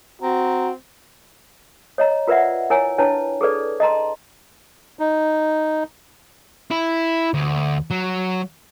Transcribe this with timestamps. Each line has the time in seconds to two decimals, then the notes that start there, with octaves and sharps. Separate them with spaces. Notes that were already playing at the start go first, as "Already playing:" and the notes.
0.22 C4 F#4 A#5
1.98 C#5 D#5 A#5
2.28 F4 A#4 B4 D5 E5 F#5
2.70 E4 A#4 C#5 G#5
2.98 D4 E4 B4 C#5 G5 A5
3.41 G#4 A4 B4 D5
3.80 D#5 A5 A#5 C6
4.99 D#4
6.71 E4
7.34 D2
7.91 F#3